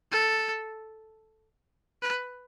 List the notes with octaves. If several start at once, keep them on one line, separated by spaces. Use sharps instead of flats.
A4
B4